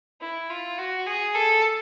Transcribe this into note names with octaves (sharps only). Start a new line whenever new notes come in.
E4
F4
F#4
G#4
A4